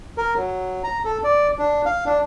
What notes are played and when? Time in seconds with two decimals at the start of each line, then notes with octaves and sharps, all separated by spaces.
0.17 A#4
0.36 F#3
0.84 A#5
1.05 A4
1.24 D5
1.58 D4
1.86 F5
2.06 D4